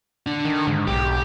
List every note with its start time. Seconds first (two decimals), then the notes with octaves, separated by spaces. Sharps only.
0.27 D3 D4
0.45 D#3
0.67 G#2
0.87 B1 G4